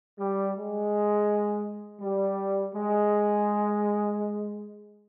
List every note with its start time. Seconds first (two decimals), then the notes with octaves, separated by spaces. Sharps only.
0.19 G3
0.56 G#3
2.00 G3
2.73 G#3